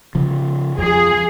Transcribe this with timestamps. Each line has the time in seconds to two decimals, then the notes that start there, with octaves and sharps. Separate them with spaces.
0.15 C#3 F3
0.79 F2 F3 G#4